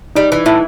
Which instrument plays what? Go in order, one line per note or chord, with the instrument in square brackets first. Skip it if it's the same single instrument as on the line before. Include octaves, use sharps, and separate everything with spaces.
[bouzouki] G3 [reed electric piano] D#4
[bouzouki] E3
[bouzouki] A2 [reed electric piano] E4